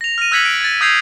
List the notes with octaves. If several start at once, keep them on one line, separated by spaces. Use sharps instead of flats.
A#6 F7
F6 A#6 D#7
E6 F#6 G#6 B6 C#7 F#7
D7 F#7
G#6 A6
D#6 E6 G6 G#6 C7 F7